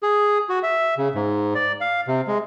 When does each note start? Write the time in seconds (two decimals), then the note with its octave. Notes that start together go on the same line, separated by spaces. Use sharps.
0.03 G#4
0.49 F#4
0.63 E5
0.97 C#3
1.15 G#2
1.55 D5
1.81 F5
2.07 C3
2.28 G#3